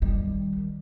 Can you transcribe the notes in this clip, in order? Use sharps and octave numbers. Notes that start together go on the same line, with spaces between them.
D#3 G3